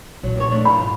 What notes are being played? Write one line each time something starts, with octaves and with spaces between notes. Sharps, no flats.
A#2 F3 F#3
D#2 C3 C#5
A3 D4
D#4 F4 B5
G#2